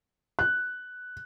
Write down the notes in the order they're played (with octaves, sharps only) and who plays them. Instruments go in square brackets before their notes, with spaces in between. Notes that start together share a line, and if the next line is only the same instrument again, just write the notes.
[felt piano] F#6